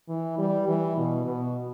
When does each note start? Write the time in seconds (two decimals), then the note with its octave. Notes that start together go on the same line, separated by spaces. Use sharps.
0.09 E3
0.38 G3
0.68 E3
0.97 B2
1.25 B2